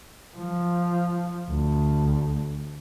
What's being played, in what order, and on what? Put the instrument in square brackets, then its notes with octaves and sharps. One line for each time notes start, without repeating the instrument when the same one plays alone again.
[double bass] F3
D2